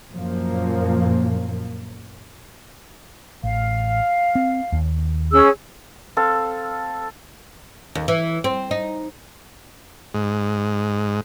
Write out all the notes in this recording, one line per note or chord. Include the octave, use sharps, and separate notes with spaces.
F#2 A#2 F3 A#3
A1 F5
C4
D#2
C#4 G#4 E6
C4 A4 F5
D#2
E3
C4
D#4
G#2